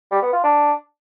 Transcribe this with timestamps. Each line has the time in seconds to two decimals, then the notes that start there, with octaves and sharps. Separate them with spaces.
0.11 G3
0.22 B3
0.33 F4
0.44 D4